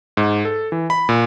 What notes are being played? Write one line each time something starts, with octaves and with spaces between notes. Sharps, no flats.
G#2
A4
E3
B5
A#2